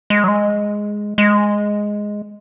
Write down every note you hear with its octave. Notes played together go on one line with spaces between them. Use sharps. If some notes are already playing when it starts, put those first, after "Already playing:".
G#3
F#3
G#3
G#3